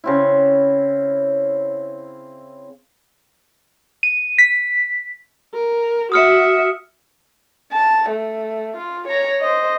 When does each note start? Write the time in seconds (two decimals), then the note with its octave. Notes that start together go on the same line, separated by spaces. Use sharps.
0.04 C#3 C4 E4
4.03 D#7
4.38 B6
5.53 A#4
6.12 F#4 E5 D#6 F6 C#7
7.72 A5
8.10 A3
8.77 F4
9.08 C#5 A#5
9.41 C5 D#5